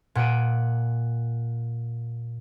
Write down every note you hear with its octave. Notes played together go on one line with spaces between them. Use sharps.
A#2 F#5 D7 D#7